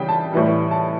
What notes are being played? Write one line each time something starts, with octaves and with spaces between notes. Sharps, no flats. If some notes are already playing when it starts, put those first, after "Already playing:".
Already playing: C#3 E3 G3 G5
A5
A2 E3 G3
A5